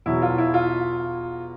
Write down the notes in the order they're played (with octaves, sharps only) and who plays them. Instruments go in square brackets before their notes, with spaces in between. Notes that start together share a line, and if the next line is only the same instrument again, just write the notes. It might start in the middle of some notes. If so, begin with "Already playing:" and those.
[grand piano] E2 B2 F#3 E4
F4
E4
F4